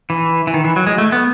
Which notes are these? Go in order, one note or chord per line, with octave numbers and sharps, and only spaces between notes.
E3
E3
D#3
E3
F#3
G#3
A3
B3